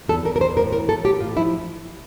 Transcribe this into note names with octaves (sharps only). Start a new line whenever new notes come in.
E2 A4
E2 A#4
A#4
E2 C5
A2 A#4
E3 A#4
A2 A4
A2 G4
A2 F4
F3 E4